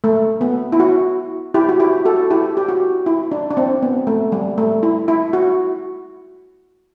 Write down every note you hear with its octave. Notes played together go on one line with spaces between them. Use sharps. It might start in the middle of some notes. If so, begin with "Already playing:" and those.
A3
B3
E4
F#4
E4 G4
F#4
E4 G4
F#4 A4
E4 G4
G4
F#4
E4
D4
D4
C4
B3
A3
G3
A3
E4
E4
F#4